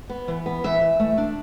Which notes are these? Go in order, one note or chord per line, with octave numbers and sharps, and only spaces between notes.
B3
E3
B3
E3 E5
E3
A3
D4